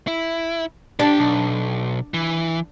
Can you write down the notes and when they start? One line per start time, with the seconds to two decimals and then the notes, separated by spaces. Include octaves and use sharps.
0.07 E4
1.00 D3 D4 G4
1.19 B1
2.14 E3